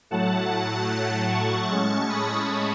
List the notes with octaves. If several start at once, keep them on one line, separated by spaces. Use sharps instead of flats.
A2 F#3 A3 F#5 A5
A5 C#6
A2 G#3 C#4
B5 D#6